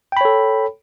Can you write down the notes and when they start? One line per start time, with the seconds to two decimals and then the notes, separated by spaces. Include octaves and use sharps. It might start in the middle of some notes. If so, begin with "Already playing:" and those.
0.12 G5
0.17 B5
0.21 C#5
0.25 A4